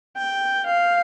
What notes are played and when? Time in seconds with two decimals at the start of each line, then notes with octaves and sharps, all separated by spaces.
0.17 G5
0.66 F5